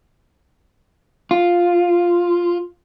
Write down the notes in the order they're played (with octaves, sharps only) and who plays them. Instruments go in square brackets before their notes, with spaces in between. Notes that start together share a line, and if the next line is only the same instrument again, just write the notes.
[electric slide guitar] F4